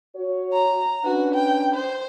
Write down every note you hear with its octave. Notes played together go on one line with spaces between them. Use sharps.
F#4 C#5
A#5
C#4 D4 F#4 B4
G5
C5